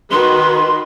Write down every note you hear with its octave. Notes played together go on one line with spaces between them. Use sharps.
D#3 F#4 B4 C6